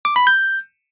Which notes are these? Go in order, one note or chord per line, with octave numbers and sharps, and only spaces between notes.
D6
B5
G6